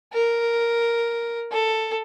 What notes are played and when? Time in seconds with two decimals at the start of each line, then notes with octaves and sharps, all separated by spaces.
0.13 A#4
1.51 A4